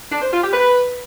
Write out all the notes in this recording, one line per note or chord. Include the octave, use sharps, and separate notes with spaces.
D4
C5
F4
G4
B4